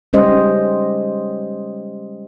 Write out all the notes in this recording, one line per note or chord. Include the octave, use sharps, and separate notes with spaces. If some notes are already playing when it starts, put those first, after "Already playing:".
G3 G#3 C#4 G4 C5 D#5